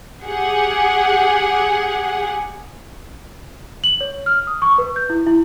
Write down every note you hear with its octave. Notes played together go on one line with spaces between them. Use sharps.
G4 G#4 F#5
F#7
C#5
F6
D#6
C#6
B4
G6
E4
E4